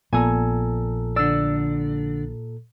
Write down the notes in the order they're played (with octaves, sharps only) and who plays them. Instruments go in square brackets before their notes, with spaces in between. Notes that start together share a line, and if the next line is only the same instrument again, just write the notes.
[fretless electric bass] A#1 B3 [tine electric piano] A#2 A4 A#5 [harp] G#5
[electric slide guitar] D3 D5 [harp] E6